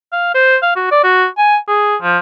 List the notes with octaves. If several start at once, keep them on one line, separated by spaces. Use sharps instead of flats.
F5
C5
F5
F#4
D5
F#4
G#5
G#4
F3